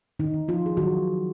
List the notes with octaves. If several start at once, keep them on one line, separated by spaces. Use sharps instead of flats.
D#3 D#4
D#3
F3 F4
G#4
D#3 F#3 F#4